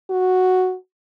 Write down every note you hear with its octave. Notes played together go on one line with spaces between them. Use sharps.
F#4